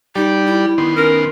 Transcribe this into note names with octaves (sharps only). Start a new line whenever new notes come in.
G3 D#4 G4 D5
E4
D#3 B3 C6
C#4 A#4